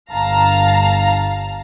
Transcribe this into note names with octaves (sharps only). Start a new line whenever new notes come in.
G1 F5 A5 A#5